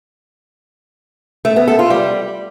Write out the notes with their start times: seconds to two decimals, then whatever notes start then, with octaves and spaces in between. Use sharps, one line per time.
1.45 A3
1.56 B3
1.68 A4
1.79 F4
1.90 G3